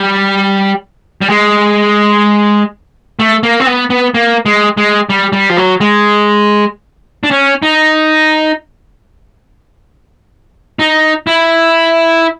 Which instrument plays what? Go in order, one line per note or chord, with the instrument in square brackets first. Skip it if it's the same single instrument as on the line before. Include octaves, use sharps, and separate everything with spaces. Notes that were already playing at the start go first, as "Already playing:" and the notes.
Already playing: [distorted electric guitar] G3
G3
G#3
A3
A#3
C4
B3
B3
A#3
G#3
G#3
G3
G3
F3
F#3
G#3
D4
C#4
D#4
D#4
E4